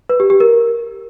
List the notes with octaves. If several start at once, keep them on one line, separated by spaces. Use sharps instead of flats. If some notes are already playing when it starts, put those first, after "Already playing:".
B4
G4
G4
A#4